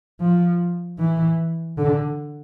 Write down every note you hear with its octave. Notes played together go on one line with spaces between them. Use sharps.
F3
E3
D3